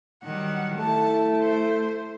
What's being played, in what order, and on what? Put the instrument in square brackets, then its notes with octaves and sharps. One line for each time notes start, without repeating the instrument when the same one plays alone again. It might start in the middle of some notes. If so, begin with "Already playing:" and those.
[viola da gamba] D#3 F#3 G3 [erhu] F#5
[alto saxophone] A3 [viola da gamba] E4 [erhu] A5
[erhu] C5